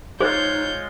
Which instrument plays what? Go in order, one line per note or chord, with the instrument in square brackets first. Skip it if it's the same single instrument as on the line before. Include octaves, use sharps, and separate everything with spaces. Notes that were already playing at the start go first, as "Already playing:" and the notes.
[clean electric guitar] G#3 F4 [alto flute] D#4 [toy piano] G#4 C5 [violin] C#5 G6